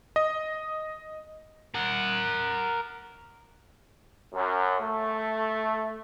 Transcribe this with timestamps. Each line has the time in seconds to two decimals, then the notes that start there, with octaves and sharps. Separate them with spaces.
0.16 D#5
1.75 A#4 F#5
4.32 F#2
4.81 A3